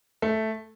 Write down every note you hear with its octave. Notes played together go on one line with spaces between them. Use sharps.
A3